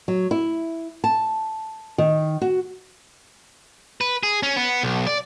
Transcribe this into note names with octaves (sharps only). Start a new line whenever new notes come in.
F#3
E4
A5
D#3
F#4
B4
G#4
C#4
B3
B1
D5